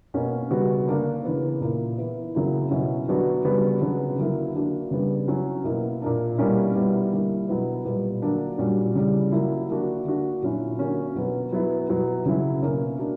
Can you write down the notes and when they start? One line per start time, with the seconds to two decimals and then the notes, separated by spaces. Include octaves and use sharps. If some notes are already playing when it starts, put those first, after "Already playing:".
0.14 B2 A#3 C#4
0.50 C#3 G3 B3 F#4
0.88 D3 A#3 D4
1.25 C#3 E3 B3
1.61 A#2 A#3 E4
1.98 E3 B3 E4
2.35 C#3 F#3 A#3 E4
2.71 B2 F#3 C#4 E4
3.08 D3 F#3 B3 D4 F#4
3.45 C#3 G3 B3 F#4
3.81 C#3 F#3 B3 D4 F#4
4.17 D3 F#3 A#3 E4
4.54 D3 A#3 D4 F#4
4.91 C#3 G3 B3
5.28 F#3 C#4 E4
5.64 B2 A#3 E4
6.02 A#2 A#3 D4
6.38 B2 G3 A#3 C#4 E4
6.74 B2 G3 B3 E4
7.11 D3 G3 A#3 E4
7.48 B2 F#3 B3 E4
7.84 A#2 G3 B3
8.22 D3 F#3 A#3 D4
8.58 A#2 G3 C#4 F#4
8.95 C#3 E3 G3
9.32 F#3 A#3 E4
9.69 D3 A#3 D4 F#4
10.05 D3 A#3 D4 F#4
10.42 A#2 F#3 C#4 E4
10.78 D3 A#3 C#4 F#4
11.15 B2 F#3 B3
11.52 F#3 B3 E4
11.88 B2 F#3 B3 E4
12.25 C#3 F#3 C#4 E4
12.62 B2 A#3 C#4
12.98 A#3 D4 F#4